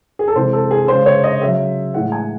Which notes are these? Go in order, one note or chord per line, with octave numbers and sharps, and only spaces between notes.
G#4
A4
C3 E3 G#3 C5
A4
G#4
C#3 G#3 C5
C#5
D#5
C#3 F#3 E5
A2 E3 G#3 F#5
G#5